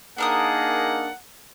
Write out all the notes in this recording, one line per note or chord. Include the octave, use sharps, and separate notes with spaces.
A#3 D4 D#4 G#4 A#4 F#5 D#6